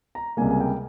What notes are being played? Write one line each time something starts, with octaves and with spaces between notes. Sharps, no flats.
A#5
C#2 C3 G3 A#3 G#5
G#5
G5